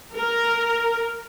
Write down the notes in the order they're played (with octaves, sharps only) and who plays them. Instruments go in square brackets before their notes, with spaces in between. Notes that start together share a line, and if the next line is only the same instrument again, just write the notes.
[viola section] A#4